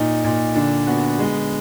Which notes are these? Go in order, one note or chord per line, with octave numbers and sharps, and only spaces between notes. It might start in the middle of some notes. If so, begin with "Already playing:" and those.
Already playing: A#2 D#4
A#2
D3 D4
B3 F#4
G#3